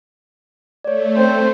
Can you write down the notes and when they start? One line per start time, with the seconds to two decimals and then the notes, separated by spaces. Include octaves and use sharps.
0.84 A3 C#5 D5
1.17 C4 C5